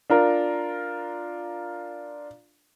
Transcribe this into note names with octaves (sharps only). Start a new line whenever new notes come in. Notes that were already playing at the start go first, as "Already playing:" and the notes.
D4 F4 A#4